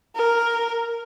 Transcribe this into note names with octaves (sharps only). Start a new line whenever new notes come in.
A#4